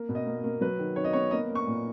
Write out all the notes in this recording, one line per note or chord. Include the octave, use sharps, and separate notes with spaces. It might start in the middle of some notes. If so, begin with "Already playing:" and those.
Already playing: A#3
B2
D#5
A#3
A#3
F#3 B4
D#3
D#3 C#5
D#5
B3 C#5
A#3 D#5
A#3
C#6
A#2